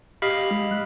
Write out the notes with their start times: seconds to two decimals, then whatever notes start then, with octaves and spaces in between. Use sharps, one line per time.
0.22 G4 D#5 F5 B5
0.51 G#3
0.71 F#6